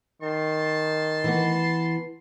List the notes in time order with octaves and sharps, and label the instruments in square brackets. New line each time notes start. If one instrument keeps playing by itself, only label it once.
[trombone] D#3 [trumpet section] A5 C6
[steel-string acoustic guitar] E3 B3